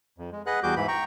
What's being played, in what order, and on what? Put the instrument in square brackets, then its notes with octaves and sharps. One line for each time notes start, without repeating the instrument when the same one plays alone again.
[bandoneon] F2
G#3
G#4 B4 D#5 F#5 F#6
E2 G3 F#4 G#4 D6 G6
G#2 E3 B5
G5 A#5 C#6